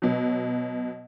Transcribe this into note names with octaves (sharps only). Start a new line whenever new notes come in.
B2 F#3